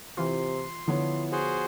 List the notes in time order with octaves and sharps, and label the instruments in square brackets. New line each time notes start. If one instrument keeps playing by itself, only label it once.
[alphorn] C3 [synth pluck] E3 F4 [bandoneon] C6
[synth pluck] D3 [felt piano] F3 B3 C#5 [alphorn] E4
[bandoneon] F#4 G#4 C5